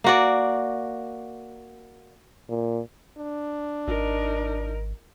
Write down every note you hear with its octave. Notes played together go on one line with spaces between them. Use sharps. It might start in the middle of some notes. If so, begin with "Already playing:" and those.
A#3 F#4 D5
A#2
D4
G#1 D#4 A#4